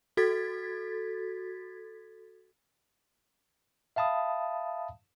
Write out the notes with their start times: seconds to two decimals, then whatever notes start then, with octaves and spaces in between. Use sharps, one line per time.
0.17 F#4 A4 G#6 A6 B6
3.96 E5 F5 A5 B5 D#6